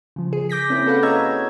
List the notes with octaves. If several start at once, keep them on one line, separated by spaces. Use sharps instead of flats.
C#3 F3
G#4
D6 G6 A#6 B6
A#3 C4 C#4 E4 G#4
C#4 F#4 A4 B4 F5 F#5
G#4 C#5 D#5 A#5 E6 G#6